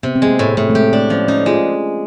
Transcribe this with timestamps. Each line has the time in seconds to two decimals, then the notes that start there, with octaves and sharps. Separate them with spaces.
0.03 C3 B3
0.16 C4
0.22 G#3
0.27 A#3
0.39 A2
0.57 A2 A3
0.70 A3
0.75 G#3 G4
0.93 A3 D4
1.10 F3 C#4
1.28 C#4 D#4
1.46 G#3 F4